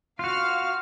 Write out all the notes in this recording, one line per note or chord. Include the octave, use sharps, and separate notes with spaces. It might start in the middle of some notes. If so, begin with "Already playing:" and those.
F4 F#4 F5 F6